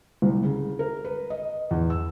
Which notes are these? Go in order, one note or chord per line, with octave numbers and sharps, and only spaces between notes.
C2
C#3
A#4
B4
D#5
E2
E6